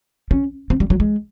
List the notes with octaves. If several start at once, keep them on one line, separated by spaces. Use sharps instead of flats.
C#4
C4
G3
F#3
G#3